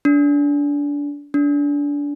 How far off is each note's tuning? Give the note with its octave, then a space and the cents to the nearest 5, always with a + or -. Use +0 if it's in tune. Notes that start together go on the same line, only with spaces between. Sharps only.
D4 -25
D4 -25